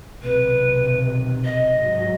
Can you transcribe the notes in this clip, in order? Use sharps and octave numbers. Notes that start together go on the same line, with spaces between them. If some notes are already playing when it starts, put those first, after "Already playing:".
B1 C3 D#3 B4
D#5
G#2 F#3